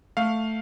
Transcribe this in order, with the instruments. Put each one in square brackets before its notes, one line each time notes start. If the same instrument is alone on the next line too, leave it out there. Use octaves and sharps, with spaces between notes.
[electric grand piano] A3 F5